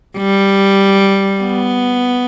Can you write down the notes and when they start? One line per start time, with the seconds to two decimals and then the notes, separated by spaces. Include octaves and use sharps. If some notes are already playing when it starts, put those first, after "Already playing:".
0.17 G3
1.41 B3